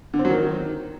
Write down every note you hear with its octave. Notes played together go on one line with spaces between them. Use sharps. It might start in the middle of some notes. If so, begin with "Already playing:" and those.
D3
C4
F#3
D#3